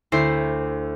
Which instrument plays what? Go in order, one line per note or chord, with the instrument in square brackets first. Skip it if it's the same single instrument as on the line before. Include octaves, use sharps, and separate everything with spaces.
[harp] D2 E4 C5 C7